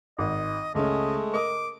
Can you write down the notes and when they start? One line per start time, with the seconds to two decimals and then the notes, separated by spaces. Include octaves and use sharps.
0.19 G#1 D#5
0.75 C#2 G#3 A3 C#4 D#5
1.33 A#4 D#5 D6 D#6